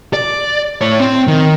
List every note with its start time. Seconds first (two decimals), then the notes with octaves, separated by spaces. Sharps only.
0.14 D5
0.81 A2 C#5
1.00 C4
1.27 D#3